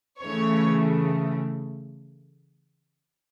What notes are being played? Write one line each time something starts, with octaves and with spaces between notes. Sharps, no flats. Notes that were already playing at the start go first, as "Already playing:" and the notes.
C#3 E3 A3 C#5